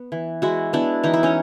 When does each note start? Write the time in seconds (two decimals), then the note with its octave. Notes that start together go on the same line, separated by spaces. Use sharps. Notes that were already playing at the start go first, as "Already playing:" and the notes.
Already playing: B3
0.12 E3
0.42 G#3 E4 F#4
0.73 B3 D4 E4
1.04 E3 D#4
1.14 E4
1.23 C#4 D#4